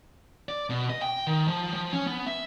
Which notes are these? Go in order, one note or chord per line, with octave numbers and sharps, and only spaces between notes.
D5
B2
D#5
G5
D#3
F3
F3
C#4
B3
E5